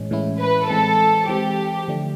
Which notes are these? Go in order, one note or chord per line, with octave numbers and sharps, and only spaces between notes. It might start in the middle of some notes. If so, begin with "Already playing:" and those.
Already playing: A2 E3 G#3 C#4
A2 E3 G#3 C#4 E4
B4
E3 G#3 C4 A4
E3 G#3 C4 G4
D3 F3 A3 D4